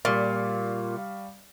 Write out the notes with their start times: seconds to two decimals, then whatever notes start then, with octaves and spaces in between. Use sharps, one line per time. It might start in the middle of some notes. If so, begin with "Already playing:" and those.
0.05 A#2 G3 F5 C#6